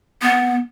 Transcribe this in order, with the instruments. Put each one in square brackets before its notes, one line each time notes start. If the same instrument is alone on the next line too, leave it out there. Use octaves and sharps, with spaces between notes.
[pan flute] B3